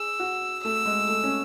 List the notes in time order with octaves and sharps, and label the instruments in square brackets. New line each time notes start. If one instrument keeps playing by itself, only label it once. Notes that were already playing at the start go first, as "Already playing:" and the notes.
Already playing: [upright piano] G#4 [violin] E6
[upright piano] F#4
[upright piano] A3 [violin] E6
[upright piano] G#3
A3
C#4